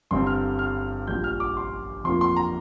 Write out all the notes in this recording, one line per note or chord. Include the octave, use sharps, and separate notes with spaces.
G1 G2 G3 C4 C6
F6
F6
A#1 A#2 G3 G6
F6
D6
C6
F2 F3 A#3 C6
C6
A#5